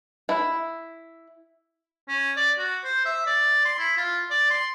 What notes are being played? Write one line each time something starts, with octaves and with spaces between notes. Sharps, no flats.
E4
C#4
D5
F#4
C5
E5
D5
C6
E4
F4
D5
C6